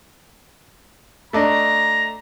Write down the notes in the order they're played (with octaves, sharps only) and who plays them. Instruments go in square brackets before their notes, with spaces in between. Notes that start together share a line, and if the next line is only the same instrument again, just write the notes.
[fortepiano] A3 D4 D#5 [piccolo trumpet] A#5